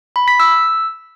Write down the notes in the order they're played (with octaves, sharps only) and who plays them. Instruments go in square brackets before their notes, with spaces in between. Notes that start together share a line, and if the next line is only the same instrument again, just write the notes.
[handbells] B5
B6
E6